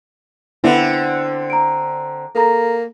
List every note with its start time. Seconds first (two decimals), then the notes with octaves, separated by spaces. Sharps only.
0.64 D3 B3 C4 E4 F#5
1.50 A#5 D7
2.35 A#3 A4 A#5 A#6